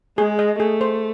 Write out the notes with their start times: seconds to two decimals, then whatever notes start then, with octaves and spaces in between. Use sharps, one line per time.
0.18 G#3 G#4
0.39 D#5
0.59 A3 G#4
0.81 C5